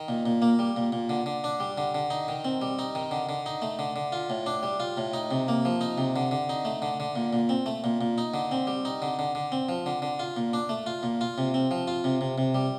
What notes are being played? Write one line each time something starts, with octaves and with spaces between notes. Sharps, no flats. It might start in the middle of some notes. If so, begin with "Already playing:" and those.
Already playing: D#3
A#2
A#2
A#3
G3
A#2
A#2
D3
D3
D4
G3
D3
D3
D#4
D#3
C4
G3
D#4
D#3
D3
D3
D#4
A3
D3
D3
F4
A2
D4
G3
F4
A2
D#4
C3
A#3
F3
D#4
C3
D3
D3
D#4
A3
D3
D3
A#2
A#2
C4
A3
A#2
A#2
D#4
D3
C4
G3
D#4
D3
D3
D3
C4
F3
D3
D3
F4
A#2
D4
A3
F4
A#2
F4
C3
C4
F3
F4
C3
C3
C3
G3